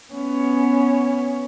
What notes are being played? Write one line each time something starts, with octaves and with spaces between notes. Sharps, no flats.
B3 C#4